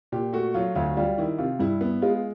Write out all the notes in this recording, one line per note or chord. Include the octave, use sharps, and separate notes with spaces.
A#2 G4
A3 F#4
F#3 F4
D2 F4
G3 F4
D#3 E4
C3 F4
G2 E4
B3
G#3 F4